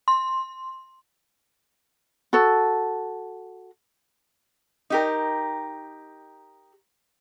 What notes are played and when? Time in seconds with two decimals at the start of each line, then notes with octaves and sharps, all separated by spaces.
0.08 C6
2.33 F#4 A4
4.90 D#4 G4 A#4